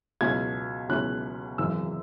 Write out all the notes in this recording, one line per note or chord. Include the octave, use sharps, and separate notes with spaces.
C#2 B2 F#3 C#4 E4 G#6
C#2 B2 F#3 C#4 E4 F#6
G#1 F#2 C#3 E3 E6